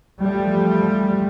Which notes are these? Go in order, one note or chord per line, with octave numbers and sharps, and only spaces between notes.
E2 F3 G3 A3